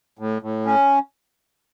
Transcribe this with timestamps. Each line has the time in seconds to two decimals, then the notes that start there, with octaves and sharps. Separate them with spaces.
0.19 A2
0.42 A2
0.66 C#4